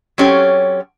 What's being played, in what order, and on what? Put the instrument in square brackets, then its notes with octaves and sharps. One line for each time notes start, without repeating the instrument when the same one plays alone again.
[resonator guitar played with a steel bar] F#3 C4 C#4 G4 A4 C#5